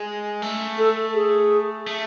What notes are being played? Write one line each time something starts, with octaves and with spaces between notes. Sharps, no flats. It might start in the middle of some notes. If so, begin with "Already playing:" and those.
Already playing: G#3
A3
A4
G#4
A3